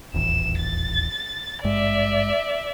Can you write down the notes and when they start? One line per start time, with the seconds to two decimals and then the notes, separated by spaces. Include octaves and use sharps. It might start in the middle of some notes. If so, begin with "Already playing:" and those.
0.14 D#1 A1 E2 E7
0.59 A6
1.64 G#1 G2 G#3 D5 E5